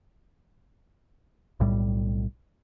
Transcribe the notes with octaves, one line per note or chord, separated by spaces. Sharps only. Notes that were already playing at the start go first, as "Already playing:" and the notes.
B1 A2 G3